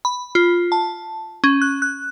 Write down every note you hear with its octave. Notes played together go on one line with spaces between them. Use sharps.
B5
F4
A5
C#4
F#6
F#6